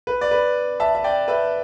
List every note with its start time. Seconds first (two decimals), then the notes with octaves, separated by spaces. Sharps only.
0.07 B4
0.21 D5
0.31 B4
0.80 E5 A5
0.95 E5
1.04 D5 G5
1.28 B4 E5